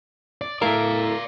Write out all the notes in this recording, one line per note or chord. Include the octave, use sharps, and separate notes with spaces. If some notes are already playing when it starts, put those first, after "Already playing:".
D5
A3 E4 A#4 D5 F5